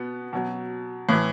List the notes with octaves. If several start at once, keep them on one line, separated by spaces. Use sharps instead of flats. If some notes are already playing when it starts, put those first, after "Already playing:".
Already playing: B2 B3
B2 F#3
A2 E3